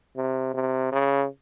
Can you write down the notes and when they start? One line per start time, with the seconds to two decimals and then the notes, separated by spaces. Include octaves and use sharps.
0.17 C3
0.54 C3
0.92 C#3